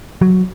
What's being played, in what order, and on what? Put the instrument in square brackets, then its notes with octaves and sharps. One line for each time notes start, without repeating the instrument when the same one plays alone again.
[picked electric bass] F#3